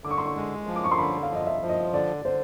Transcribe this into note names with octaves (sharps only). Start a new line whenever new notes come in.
D3 D6
C#6
C6
C#6
G#3
F3
D6
C#6
C6
D3 B5
F5
F3 D#5
E5
F3
D#5
D3 D5
D3 C5